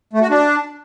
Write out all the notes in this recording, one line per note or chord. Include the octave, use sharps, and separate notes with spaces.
A3
F#4
D4